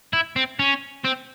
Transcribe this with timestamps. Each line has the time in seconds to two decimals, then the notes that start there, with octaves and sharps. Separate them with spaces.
0.13 E4
0.36 C4
0.59 C#4
1.04 C4